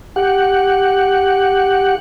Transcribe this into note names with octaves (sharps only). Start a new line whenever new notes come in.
G4 F#5